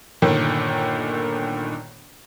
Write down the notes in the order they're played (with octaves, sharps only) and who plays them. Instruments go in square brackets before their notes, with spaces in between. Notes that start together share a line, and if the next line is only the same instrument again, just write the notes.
[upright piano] G1 A#2 D3 D#3